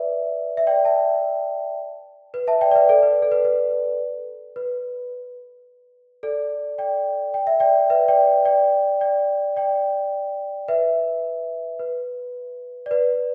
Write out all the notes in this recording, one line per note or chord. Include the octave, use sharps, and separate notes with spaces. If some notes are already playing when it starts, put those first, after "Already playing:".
Already playing: B4 D5 E5
E5
D5 G5
E5 A5
B4
E5 A5
D5 G5
D5
B4 E5
A4 D5
B4
A4
B4
B4
B4
A4 D5
D5 G5
G5
E5
D5 G5
B4 E5
D5 G5
D5 G5
D5 G5
D5 G5
B4 E5
B4
D5
B4